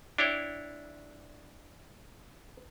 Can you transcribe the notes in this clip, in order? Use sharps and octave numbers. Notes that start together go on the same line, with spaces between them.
D4 E4 C#5 G5